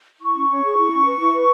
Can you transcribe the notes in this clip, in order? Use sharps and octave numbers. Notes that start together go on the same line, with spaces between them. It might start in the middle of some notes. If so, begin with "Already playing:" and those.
E4 C#6
C#4
C#5
G#4
E4
C#4
B4
E4
B4